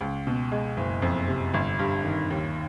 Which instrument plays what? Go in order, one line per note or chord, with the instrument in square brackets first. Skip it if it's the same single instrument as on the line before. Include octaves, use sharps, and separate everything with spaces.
[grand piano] C#2
B2
G#3
F#1
F2
C3
G1
G2
D#3
D#2